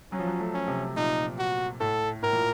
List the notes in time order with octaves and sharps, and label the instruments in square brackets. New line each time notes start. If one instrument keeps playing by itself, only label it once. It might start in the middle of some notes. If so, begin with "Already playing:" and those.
[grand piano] F#3 [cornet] C#4
[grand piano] F3
F#3
A3
[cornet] C#4
[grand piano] C3
[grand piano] A#2 [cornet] D#4
[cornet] F#4
[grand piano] A2 [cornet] A4
[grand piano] A2 [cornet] A#4
[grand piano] A#2